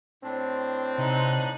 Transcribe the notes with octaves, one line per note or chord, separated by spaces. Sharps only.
A2 C4 D4
C3 D#4 F#6